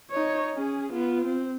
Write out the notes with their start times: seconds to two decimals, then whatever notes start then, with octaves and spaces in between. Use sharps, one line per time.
0.11 D#4 C#5
0.53 C#4 G#4
0.93 B3 F4
1.25 C4